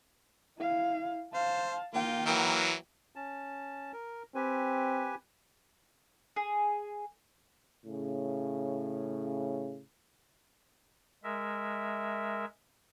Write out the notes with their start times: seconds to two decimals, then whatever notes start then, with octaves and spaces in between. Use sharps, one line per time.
0.58 E4 F5
1.34 C5 F5 A5
1.94 A#3 F4 G5
2.26 E3 F#3 A#4
3.16 C#4 A5
3.93 A#4
4.35 C4 G4 B4 G#5
6.36 G#4
7.86 A2 C#3
11.24 G#3 A#4 E5